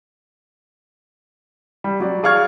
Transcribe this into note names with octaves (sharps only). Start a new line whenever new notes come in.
G3
F#3 D5
G#4 D5 F5 C#6 F6 G#6